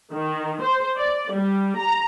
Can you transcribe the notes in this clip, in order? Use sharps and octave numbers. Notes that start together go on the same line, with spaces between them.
D#3
C5
D5
G3
A#5